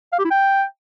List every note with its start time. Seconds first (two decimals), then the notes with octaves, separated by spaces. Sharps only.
0.13 F5
0.19 G4
0.25 E4
0.31 G5